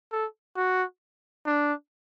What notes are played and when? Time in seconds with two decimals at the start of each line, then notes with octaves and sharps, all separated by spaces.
0.12 A4
0.57 F#4
1.46 D4